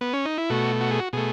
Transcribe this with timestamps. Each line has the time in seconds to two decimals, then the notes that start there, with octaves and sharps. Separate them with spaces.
0.01 B3
0.13 C#4
0.25 D#4
0.38 E4
0.50 B2 A3 F#4
0.81 F#4
0.91 G#4
1.00 F#4
1.13 B2 A3 G#4